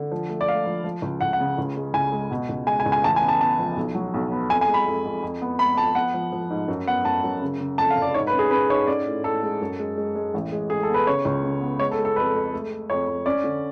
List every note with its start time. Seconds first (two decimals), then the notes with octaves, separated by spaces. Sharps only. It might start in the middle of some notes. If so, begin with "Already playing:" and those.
Already playing: D3
0.12 F3
0.29 A3
0.41 D5
0.48 A3 F5
0.66 F3
0.84 F3
1.02 C#2
1.21 C#2 F#5
1.33 F#5
1.40 C#3
1.58 C#2
1.77 G#3
1.94 C#2 G#5
2.13 G#3
2.31 B2
2.49 C#2
2.67 G#3 G#5
2.80 G#5
2.86 C#2
2.92 G#5
3.04 A1 A5
3.16 G#5
3.22 B3
3.28 A5
3.41 B3 A5
3.59 F3
3.77 B1
3.95 F#3
4.14 B1
4.32 B3
4.50 F2 G#5
4.61 G#5
4.68 G#3
4.74 B5
4.86 F2
5.05 F2
5.22 F2
5.42 B3
5.59 B3 B5
5.78 F3 A5
5.95 B3 F#5
6.14 F3
6.33 F3
6.50 G#2
6.68 F#2
6.88 B3 F#5
7.05 F#2 A5
7.24 F#2
7.42 C#3
7.60 C#3
7.78 F2 A5
7.91 F5
7.97 F1
8.02 D5
8.14 G#2 C#5
8.27 B4
8.33 C#4
8.39 G#4
8.51 C#4 B4
8.70 G#2 C#5
8.87 C#4 D5
9.06 A2
9.24 A2 A4
9.43 G#3
9.61 F#2
9.80 G#3
9.98 G#3
10.16 G#3
10.34 A1
10.52 G#3
10.70 A2 G#4
10.83 A4
10.89 B3 B4
11.07 C#3 C#5
11.25 C#2
11.44 C#3
11.61 B3
11.80 G#3 C#5
11.92 A4
11.99 G#3
12.05 A4
12.16 F2 B4
12.35 G#3
12.53 A3
12.71 A3
12.90 F2 C#5
13.07 F2
13.26 C#4 D5
13.44 D3